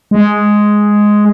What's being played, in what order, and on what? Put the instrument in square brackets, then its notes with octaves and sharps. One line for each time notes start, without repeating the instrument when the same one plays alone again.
[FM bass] G#3